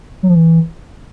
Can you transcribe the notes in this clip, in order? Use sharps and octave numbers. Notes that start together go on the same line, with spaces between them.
F#3
F3
E3